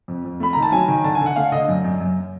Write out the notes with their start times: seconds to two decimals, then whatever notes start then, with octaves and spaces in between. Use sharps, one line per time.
0.08 F2
0.25 F2
0.40 A3 B5
0.53 D#3 A#5
0.63 A5
0.72 F#3 G#5
0.88 D#3
1.04 D3 A5
1.15 G#5
1.21 D3
1.26 F#5
1.36 A3 F5
1.52 D3 D#5
1.68 F#2
1.84 F#2
2.00 F#2